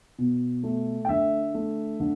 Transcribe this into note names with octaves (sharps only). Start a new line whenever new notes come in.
B2
A3
G5
D3 E5
A3
D3